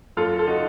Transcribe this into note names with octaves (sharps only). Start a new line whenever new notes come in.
F#2 F4 A4
A4
C#3 D#4 F#4